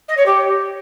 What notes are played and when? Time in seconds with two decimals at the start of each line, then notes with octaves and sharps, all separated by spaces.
0.08 D#5
0.17 C#5
0.26 G4